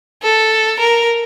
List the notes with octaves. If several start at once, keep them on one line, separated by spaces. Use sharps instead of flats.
A4
A#4